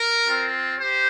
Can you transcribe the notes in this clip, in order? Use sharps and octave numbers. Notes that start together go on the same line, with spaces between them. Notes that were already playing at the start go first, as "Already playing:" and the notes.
Already playing: A#4
C4 F4
G4 C5